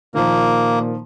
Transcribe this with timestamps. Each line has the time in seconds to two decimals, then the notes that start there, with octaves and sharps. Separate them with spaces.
0.15 A#2 D#3 F3 A#3